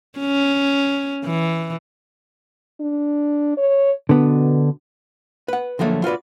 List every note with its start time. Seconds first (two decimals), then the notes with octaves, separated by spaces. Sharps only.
0.19 C#4
1.25 E3
2.80 D4
3.57 C#5
4.09 B2 D3 B3
5.48 B4 F#5
5.79 D3 F3 F#3 A3 A#3
6.04 F4 F#4 B4 D5